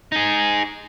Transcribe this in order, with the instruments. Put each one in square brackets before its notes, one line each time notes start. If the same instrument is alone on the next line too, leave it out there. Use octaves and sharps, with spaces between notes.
[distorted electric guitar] D#4 G#4